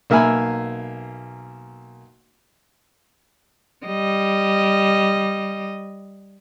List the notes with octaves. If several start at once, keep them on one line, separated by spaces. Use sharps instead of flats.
B1 A#3 E5 F5 G#5 B5
G3 D#5